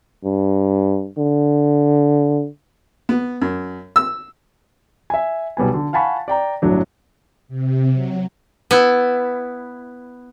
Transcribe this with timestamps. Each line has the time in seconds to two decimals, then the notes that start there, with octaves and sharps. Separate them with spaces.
0.24 G2
1.17 D3
3.09 B3
3.42 F#2
3.96 E6
5.10 E5 G#5
5.57 B1 G3 B3 G#5
5.74 D3
5.93 F5 F#5 G#5 A5 B5 C#6
6.28 D5 G5 A#5
6.62 G1 A2 F#3 D4
7.48 C3
7.93 F#3
8.71 B3 E4